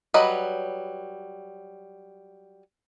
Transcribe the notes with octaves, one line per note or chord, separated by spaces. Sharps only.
F#3 G3 B4 D#5